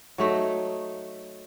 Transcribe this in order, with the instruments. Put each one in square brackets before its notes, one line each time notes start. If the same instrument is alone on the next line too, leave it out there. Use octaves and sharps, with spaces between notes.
[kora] F#3 A3 D#4